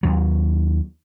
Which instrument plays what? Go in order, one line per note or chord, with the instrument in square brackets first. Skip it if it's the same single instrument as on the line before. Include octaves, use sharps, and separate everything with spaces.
[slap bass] D#2 F#3